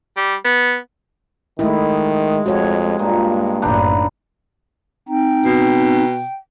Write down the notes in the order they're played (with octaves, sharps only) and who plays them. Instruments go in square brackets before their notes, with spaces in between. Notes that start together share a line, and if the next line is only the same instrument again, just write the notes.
[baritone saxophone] G3
B3
[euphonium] D#3 [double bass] G#3 [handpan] A3 E4
[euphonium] F2 [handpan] F#4 C#5
[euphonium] G2 [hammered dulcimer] A#2
[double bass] F#1 A2 [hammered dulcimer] D4 D#4 B4
[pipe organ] C4 D#4 [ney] G5
[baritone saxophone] B2